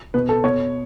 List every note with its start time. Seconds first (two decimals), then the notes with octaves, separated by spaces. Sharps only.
0.14 B2 B4
0.29 A4
0.44 B2 C#5